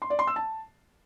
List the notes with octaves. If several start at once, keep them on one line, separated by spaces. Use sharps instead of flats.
C6
D5
C6
E6
A5